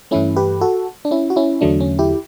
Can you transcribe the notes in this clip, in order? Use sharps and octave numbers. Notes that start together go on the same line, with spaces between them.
G2 E3 A3 C#4 E4
G4 B4
F#4 A4
D4
C#4 E4
F#4
C#4 E4
E2 D3 F#3 A3 D4
C#4
E4 G4